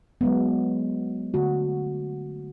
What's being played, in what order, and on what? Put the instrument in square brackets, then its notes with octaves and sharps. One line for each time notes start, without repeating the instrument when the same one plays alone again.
[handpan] F#3 G#3 B3
D3 A3 F#4